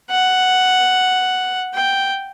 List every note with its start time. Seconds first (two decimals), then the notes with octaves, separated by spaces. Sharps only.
0.11 F#5
1.74 G5